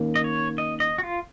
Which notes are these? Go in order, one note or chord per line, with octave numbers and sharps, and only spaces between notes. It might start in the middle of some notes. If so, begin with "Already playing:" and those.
Already playing: D#3 A#3 C#4
D#5
C#5
D#5
D#5
F#4
F4